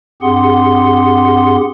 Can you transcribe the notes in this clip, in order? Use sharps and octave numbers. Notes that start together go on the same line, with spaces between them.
G2 C4 G4 G#4 F#5 C6